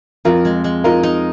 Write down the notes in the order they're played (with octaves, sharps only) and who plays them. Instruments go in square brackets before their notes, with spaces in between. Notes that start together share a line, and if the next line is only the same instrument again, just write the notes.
[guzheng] F2 [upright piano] F4 A#4
[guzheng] G#3
G#3
[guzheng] D#4 [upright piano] F4 A#4
[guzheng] D#4